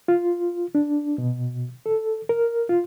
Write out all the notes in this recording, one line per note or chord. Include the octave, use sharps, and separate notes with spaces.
F4
D4
B2
A4
A#4
F4